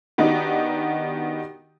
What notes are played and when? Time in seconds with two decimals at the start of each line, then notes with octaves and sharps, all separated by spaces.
0.18 D#3 B3 D4 D#4 F#4 G4